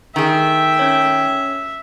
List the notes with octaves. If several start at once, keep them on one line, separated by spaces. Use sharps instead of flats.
D#3 G#4 E5 G5
C#4 C#5